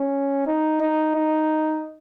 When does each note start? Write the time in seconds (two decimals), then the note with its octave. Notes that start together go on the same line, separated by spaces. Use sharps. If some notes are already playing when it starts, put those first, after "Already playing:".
Already playing: C#4
0.47 D#4
0.81 D#4
1.15 D#4